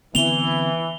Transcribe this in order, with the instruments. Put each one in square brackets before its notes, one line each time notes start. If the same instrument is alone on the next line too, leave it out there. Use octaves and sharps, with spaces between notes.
[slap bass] D3 B3 C4 [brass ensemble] E3 [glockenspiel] F7 G7